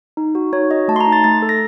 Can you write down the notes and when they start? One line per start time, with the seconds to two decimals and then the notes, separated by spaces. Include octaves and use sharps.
0.17 D#4
0.35 F#4
0.53 D#4 C#5
0.70 F#4 D#5
0.88 A3 A5
0.96 C6
1.01 A#5
1.06 D#4
1.12 A6
1.24 A3 A6
1.42 A4
1.49 A#6